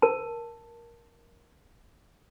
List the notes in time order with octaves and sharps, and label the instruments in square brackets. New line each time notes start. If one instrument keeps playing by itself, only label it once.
[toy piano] A#4 A5